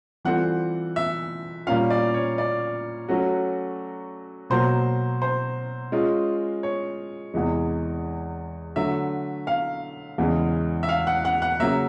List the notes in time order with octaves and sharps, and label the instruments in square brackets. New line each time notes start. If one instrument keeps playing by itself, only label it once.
[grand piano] E3 G3 C4 F4 A4 [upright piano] F#5
[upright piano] E5
[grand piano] A#2 G3 A#3 C#4 F4 [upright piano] F5
[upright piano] D5
C#5
D5
[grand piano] F#3 A3 C#4 F#4
[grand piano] B2 F#3 A#3 [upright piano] C5
[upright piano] C5
[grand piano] G#3 C#4 F4
[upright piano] C#5
[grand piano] E2 C3 E3 G#3
[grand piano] D3 F#3 A3 [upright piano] E5
[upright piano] F5
[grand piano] E2 C#3 E3 G#3
[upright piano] E5
F5
F#5
F#5
F#5
[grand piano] C#3 F#3 A#3 [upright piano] E5